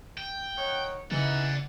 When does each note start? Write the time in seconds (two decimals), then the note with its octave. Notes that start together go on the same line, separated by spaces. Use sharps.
0.18 G5
0.55 D#3 C#5 F#5
1.12 C#3 E3 D#4 D5 F#5